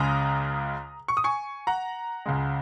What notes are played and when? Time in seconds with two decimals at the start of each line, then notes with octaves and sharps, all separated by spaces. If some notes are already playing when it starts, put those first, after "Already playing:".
Already playing: C#2 C#3 G#3 A#5 D#6
1.08 C#6
1.17 D#6
1.24 G#5 C#6
1.67 F#5 A#5
2.26 C#2 C#3 G#3